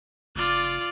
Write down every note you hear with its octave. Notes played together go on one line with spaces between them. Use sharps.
F1 F4 D5